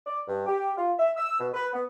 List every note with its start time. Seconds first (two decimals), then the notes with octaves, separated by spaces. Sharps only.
0.06 D5
0.28 G2
0.47 G4
0.77 F4
0.99 E5
1.17 E6
1.40 B2
1.54 B4
1.73 B3